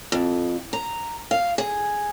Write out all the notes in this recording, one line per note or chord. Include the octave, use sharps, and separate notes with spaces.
F2
A#5
F5
G#4